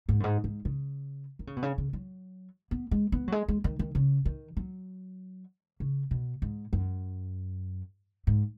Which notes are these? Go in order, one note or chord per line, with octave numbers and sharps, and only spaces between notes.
G#2
F#2
G#2
G#2
C#3
D#3
C#3
B2
C#3
C#3
F#3
B3
G#3
B3
F#3
G#3
G#3
D#3
D#3
C#3
D#3
F#3
C#3
B2
G#2
F#2
G#2